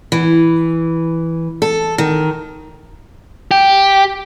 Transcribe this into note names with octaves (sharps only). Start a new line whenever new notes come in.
E3
A4
D#3
G4